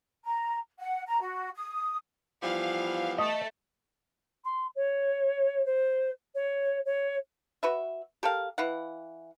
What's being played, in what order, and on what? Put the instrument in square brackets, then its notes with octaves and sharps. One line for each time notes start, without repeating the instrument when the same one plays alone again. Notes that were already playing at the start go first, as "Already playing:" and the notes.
[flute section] A#5
F#5
A#5
F#4
D#6
[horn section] E3 G3 B3 [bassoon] F3 [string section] F5
[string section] A3 [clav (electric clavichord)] D#5
[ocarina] C6
C#5
C5
C#5
C#5
[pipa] F#4 B4 E5
G4 A4 A#4 F5
E3 F5 F#5